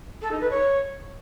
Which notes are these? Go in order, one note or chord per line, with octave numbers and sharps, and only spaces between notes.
A4
D#4
B4
C#5